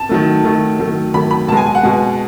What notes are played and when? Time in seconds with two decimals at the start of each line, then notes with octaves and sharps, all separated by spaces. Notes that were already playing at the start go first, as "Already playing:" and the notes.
Already playing: A5
0.09 D#3 F#3 A3
0.44 D#3 F#3 A3
0.79 D#3 F#3 A3
1.13 D#3 F#3 A3 B5
1.31 B5
1.48 B2 A5
1.52 G#3 G#5
1.66 G#5
1.75 F#5
1.83 B2 G#3